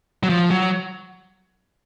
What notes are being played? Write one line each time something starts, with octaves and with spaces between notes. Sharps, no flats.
F#3
F3
F#3